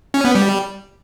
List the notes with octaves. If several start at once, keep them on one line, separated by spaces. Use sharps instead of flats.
C#4
B3
G3